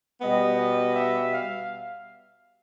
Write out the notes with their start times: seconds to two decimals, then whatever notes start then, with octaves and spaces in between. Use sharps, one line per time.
0.21 B2 G3 B3 D#5
0.58 D#5
0.95 E5
1.33 F5